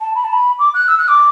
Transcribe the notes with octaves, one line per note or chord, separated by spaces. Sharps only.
A5
B5
A5
B5
D6
F#6
E6
F#6
D6